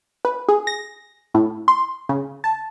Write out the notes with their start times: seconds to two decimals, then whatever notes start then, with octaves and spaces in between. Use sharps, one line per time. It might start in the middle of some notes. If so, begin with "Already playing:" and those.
0.25 B4
0.48 G#4
0.67 A#6
1.34 A2
1.68 C6
2.09 C#3
2.44 A5